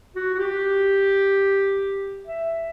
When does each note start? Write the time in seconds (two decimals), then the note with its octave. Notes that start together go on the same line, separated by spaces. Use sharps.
0.15 F#4
0.34 F#4
0.38 G4
2.27 E5